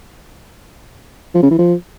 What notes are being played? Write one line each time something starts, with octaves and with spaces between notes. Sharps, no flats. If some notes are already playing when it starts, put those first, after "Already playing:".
F3
C#3
E3
F3